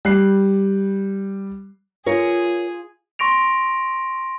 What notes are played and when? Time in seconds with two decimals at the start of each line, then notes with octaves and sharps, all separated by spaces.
0.05 G3 F#6 C7
2.06 F4 G#4 A#4 C#5
3.19 C6 C#6 A#6 D7 F7